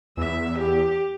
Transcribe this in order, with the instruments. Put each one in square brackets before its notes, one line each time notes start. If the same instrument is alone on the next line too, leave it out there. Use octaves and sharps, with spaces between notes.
[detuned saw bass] E2 [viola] E5
[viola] G4